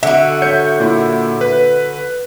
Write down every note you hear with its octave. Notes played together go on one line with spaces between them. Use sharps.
D3 F#4 E5
C#5 E5 G6 C#7
A#2 E4
B4